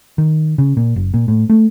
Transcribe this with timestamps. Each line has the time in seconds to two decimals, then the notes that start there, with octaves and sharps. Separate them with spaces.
0.18 D#3
0.58 C#3
0.77 A#2
0.96 F#1
1.14 A#2
1.28 A2
1.49 A3